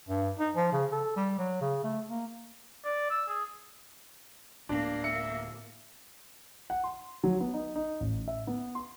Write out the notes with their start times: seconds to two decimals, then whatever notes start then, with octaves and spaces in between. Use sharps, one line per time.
0.08 G2
0.39 D#4
0.55 F3
0.72 C#3
0.92 A4
1.16 G3
1.38 F#3
1.61 C#3
1.84 A3
2.10 A#3
2.85 D5
3.10 E6
3.29 G#4
4.69 D1 A2 A#3 B3 D4
5.04 E5 C#7
6.70 F#5
6.84 C6
7.24 F#3
7.40 B3
7.54 D#4
7.76 D#4
8.00 A1
8.28 E5
8.47 B3
8.75 C6